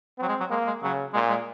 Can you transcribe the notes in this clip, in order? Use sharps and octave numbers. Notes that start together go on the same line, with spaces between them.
F#3 C4
G#3
F#3
G#3 A#3
G#3
C#3 F#3
A#2 G#3
G#3